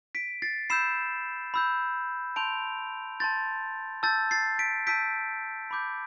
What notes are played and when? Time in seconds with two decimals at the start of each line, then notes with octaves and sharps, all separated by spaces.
0.15 B6 D7
0.42 A6 C7
0.70 B5 E6 G6 C7 E7
1.54 B5 E6 G6
2.36 A5 C6 G6 D7 F7
3.20 A5 C6 G6 A6
4.03 A5 E6 G6 A6
4.31 A6 C7
4.59 B6 D7
4.87 A5 E6 G6 B6 D7
5.71 B5 D6 G6